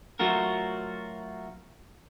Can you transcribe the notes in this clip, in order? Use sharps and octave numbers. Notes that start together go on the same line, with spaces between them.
F#3 A3 F4 F#4 A#4